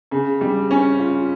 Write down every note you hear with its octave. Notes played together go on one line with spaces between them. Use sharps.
C#3
G3
C#4
F4